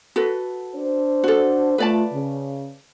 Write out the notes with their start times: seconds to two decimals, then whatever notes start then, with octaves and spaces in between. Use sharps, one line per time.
0.16 F#4 A4 B4
0.75 D4 C5
1.24 F#4 A4
1.78 A3 F4 B4 D5 A5
2.11 C#3